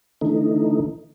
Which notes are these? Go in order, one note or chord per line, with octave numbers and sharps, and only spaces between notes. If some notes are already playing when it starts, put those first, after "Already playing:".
D3 E3 A3 D#4